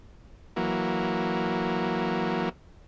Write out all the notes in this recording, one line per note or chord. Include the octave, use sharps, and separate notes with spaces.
E3 F#3 A#3